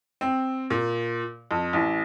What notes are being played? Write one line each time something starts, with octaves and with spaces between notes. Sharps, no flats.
C4
A#2
F2
A1